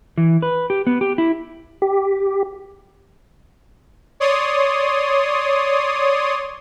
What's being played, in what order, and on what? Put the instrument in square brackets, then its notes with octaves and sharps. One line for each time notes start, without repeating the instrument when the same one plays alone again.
[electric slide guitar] E3
B4
G4
B3
G4
E4
[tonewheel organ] G4
[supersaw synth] C#5 D5 C6 D#6